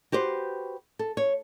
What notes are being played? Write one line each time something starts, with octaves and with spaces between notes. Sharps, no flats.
F#4 G4 B4 C5
A4
C#5